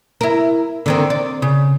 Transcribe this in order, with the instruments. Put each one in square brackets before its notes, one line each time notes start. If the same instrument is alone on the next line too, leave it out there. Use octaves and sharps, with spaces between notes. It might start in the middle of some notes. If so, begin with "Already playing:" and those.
[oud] E4 A#4
D3 D#3 C4
D5
C#3